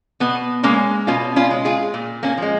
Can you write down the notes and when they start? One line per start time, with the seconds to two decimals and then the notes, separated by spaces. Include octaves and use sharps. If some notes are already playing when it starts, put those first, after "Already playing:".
0.20 B2 B3
0.63 G#3 A#3 C#4
1.07 B2 C#4 F4
1.36 C#4 F4
1.51 G#3
1.65 F4 G#4
1.94 A#2
2.23 A#3 C#4
2.38 F3 G#3